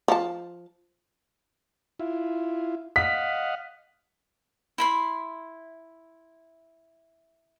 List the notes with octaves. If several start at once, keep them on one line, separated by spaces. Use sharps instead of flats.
F3 A5
E4 F4
D#5 F5 F#5 B6
E4 B5 C6